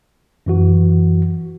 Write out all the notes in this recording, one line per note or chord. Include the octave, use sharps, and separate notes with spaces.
F#2 E3 F#4